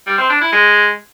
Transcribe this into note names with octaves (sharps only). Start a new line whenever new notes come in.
G3
C4
D4
E4
G#3